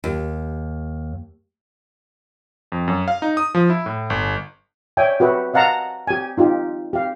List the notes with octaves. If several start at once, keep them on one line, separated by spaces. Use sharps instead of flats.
D#2
F2
F#2
F5
D#4
D#6
F3
E4
A2
G1
C#5 D5 E5 G5 G#5
F#4 G4 B4 E5
D#5 F5 F#5 A5 A#5
G4 G#5
D#4 F4 G4
G4 F5